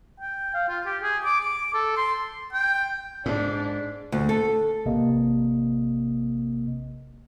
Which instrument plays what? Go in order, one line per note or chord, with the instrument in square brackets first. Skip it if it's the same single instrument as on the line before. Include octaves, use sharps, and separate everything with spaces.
[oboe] G5
F5
F4
G4
G#4
D6
D6
A4
C6
[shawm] G5
[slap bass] G#2 [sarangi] D4
[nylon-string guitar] D2
A4
[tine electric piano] A1 C3 A#3 D#5